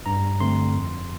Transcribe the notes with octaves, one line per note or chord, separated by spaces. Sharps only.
G2 A#5
D3 A3 C4 C6
F2